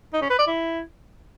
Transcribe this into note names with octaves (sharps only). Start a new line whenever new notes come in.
D#4
C#4
B4
D5
E4